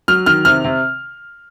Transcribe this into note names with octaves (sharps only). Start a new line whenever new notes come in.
F#3 F6
D#3 F6
C3 F6
C3